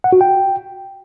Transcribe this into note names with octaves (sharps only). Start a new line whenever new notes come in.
F#5
F#4
G5